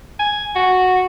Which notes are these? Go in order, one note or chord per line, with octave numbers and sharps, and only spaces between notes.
G#5
F#4